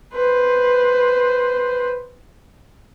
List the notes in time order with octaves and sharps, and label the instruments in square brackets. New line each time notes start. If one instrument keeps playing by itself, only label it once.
[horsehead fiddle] B4 C5